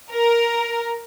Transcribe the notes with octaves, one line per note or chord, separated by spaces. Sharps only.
A#4